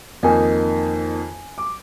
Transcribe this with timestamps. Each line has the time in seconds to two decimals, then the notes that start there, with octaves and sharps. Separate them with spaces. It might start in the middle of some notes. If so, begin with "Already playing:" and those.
0.23 F2 D#3 A#3 D#4 G#5
1.58 D6